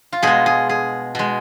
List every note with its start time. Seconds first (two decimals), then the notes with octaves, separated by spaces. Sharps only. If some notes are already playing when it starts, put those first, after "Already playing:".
0.12 F4
0.22 B2 G#3 G#4
0.46 G#4
0.69 G#4
1.15 B2 G#3